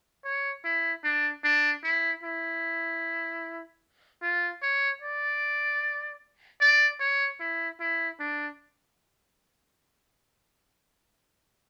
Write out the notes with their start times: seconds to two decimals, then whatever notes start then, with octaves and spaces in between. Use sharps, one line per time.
0.25 C#5
0.65 E4
1.04 D4
1.44 D4
1.84 E4
2.23 E4
4.22 F4
4.62 C#5
5.02 D5
6.61 D5
7.00 C#5
7.40 E4
7.81 E4
8.20 D4